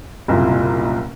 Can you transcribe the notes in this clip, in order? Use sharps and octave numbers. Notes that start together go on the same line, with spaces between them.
F#1 C2 A#2